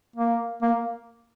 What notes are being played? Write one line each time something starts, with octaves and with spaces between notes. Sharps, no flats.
A#3
A#3